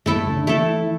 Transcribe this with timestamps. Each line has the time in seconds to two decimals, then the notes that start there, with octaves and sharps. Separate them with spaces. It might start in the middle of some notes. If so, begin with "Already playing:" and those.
0.06 G2 A3 E4 A4
0.16 G2
0.26 C#3
0.37 D3
0.47 E3 A3 E4 A4